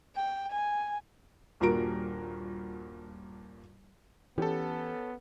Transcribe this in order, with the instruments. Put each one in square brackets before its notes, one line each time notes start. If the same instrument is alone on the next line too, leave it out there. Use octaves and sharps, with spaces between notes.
[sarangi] G5
G#5
[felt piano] D#1 G2 A#2 F#4 A#4 D7
[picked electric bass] E3 [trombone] B3 [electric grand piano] C#4 A4 [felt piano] G4